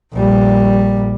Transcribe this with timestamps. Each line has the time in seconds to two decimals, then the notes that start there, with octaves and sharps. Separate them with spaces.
0.14 A#1 G3